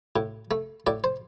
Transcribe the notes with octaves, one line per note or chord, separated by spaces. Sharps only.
A2
A3
A2 D5
C5